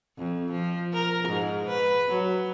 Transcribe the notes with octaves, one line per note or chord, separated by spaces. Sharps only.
F2
F3
A#4
G#2
B4
F#3